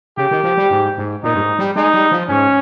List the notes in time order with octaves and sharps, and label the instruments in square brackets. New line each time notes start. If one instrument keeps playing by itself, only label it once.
[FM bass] C#3 [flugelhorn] G4
[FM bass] D#3
F3
G3
G#2
G#2
[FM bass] A#2 [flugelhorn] D#4
[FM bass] G2
G#2
G3
[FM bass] G#3 [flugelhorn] D#4
[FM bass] G3
F3
[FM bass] G#2 [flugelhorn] C#4